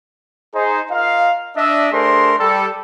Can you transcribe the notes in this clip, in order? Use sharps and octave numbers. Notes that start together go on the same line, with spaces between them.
D#4 G#4 C5
F4 A#4 D#5 F5
D4 D#5 E5
A3 D4 G#4 A#4 C5 C6
G3 A4